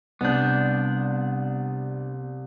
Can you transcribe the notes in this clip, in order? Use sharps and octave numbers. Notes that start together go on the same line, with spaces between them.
C2 C3 B3 D4 G6